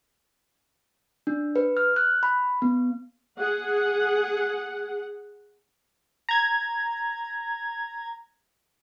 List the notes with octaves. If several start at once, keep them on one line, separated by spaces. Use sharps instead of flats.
D4
B4
F6
F#6
B5
B3
G#4 F#5
A#5 G#6